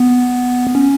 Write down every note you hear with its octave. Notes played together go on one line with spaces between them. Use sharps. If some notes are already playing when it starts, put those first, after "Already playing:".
Already playing: B3
C#4